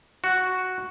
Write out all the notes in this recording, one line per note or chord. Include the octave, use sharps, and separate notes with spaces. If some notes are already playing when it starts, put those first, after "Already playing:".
F#4